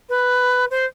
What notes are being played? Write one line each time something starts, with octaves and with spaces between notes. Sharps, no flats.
B4
C5